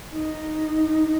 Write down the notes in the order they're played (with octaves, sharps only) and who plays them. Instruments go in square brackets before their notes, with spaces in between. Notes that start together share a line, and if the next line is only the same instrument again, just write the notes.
[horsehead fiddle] D#4